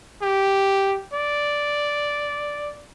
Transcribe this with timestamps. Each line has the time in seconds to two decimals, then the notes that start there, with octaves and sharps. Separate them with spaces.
0.22 G4
1.13 D5